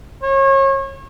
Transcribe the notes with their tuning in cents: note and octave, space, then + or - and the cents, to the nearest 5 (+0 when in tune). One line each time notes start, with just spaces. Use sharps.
C#5 -30